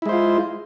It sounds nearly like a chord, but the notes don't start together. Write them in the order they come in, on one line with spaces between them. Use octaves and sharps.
E4 G#3 C5 F4